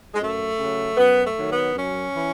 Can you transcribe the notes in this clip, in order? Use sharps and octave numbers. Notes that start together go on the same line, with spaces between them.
G#3
F#2 A3
C#3
F#3
F#2 B3
A3
D#3 F#3
B3
F#2 C#4
E3